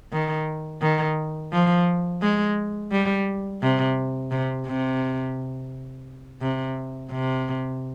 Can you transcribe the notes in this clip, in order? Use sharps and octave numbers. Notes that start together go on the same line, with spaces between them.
D#3
D#3
F3
G#3
G3
C3
C3
C3
C3
C3